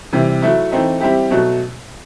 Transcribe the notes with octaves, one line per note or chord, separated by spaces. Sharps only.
C3 E3 G3 C4
F#3 A3 E4
E3 A3 C4 D#4
G3 C4 E4 G4
B2 F#3 A3